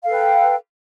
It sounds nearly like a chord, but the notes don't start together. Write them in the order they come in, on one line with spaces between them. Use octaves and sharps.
F5 A4 B4 G5